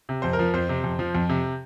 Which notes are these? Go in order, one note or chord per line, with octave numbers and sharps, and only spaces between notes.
C3
F2 C5
A#4
F3
F2 C5
C3
F2
F3
F2
C3